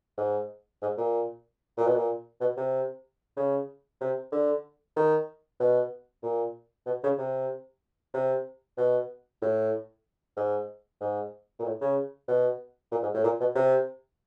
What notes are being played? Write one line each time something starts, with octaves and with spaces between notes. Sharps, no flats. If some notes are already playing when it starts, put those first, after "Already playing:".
G#2
G#2
A#2
A#2
B2
A#2
B2
C3
C#3
C3
D3
D#3
B2
A#2
B2
C#3
C3
C3
B2
A2
G#2
G#2
A#2
A2
C#3
B2
A#2
G#2
A2
A#2
B2
C3